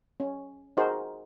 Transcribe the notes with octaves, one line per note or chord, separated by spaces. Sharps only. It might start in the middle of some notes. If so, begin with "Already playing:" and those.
C#4
D#4 F#4 G#4 A#4 C5